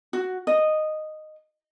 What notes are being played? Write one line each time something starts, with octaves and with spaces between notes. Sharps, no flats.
F#4
D#5